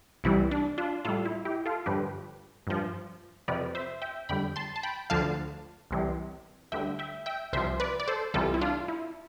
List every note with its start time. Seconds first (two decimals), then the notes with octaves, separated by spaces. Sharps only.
0.24 C2 C3 E3 G3 E4
0.51 D4
0.78 D4 F4
1.05 A2 G3 F4 A4
1.25 E4
1.45 E4 G4
1.66 F4 A4
1.86 G2 D3 F3 G4 B4
2.67 G2 F3
3.48 F2 C3 F3 B4 D5
3.75 C5 E5
4.02 E5 G5
4.29 F2 D3 G3 G5 B5
4.56 A5 C6
4.76 A5
4.83 G5 B5
5.10 D2 D3 F3 F5 A5
5.91 C2 C3 E3 G3
6.72 D2 D3 G3 E5 G5
6.99 E5 G5
7.26 E5 G5
7.53 C2 C3 F3 C5 E5
7.80 B4 D5
8.00 D5
8.08 A4 C5
8.34 C2 C3 E3 G3 F4 A4
8.54 E4
8.61 D4 F4
8.88 E4